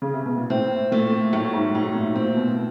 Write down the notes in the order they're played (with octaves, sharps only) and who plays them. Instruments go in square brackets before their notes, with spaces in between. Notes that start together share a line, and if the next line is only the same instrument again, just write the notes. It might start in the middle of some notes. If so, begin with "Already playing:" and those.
[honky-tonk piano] C#3
C3
B2
A#2
[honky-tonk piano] A2 [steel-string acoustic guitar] C4
[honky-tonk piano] A#2 [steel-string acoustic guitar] A3
[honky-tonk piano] A2 [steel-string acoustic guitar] F#3
[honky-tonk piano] G#2
[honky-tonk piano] A2 [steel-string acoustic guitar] A3
[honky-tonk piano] A#2
[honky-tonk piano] A#2 [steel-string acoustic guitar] C4
[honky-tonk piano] B2